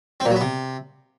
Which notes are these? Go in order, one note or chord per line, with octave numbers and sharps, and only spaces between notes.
C4
A#2
F#3
B3
C3